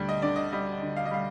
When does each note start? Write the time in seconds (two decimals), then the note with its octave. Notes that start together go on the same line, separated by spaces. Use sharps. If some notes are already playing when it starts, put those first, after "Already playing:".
Already playing: D2 G3
0.09 D#5
0.22 D3 D5
0.36 D#5
0.52 G3 D#5
0.82 D3
0.96 F5
1.05 D#5
1.11 G3 F5